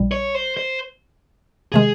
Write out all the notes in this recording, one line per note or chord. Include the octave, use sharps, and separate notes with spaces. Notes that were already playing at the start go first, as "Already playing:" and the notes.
Already playing: A#1 A#2 G3
C#5
C5
C5
C3 D#3 G#3 G#4